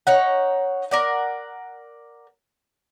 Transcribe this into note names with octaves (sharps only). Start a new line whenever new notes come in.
D#4 C#5 F#5
A#4 D5 F#5